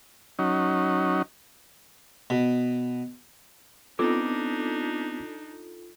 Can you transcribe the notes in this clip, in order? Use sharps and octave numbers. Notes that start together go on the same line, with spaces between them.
F#3 C#4 D#4
B2
B3 C4 D4 D#4 F4 A4 D6